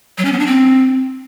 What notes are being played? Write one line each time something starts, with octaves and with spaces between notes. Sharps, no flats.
F#3
C#4
B3
D4
C4